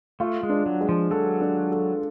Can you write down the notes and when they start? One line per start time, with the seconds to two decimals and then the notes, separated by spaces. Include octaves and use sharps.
0.20 A3 F4
0.43 G#3
0.50 D4
0.66 F#3
0.81 G#3
0.89 F3
1.11 F#3 A4
1.41 D4
1.72 A4